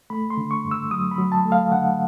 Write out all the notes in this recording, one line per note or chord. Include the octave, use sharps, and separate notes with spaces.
A3 B5
C6
D3
C#6
G2
E6
F#3 D#6
B5
F#3
A5
A3
F5
D3 F#5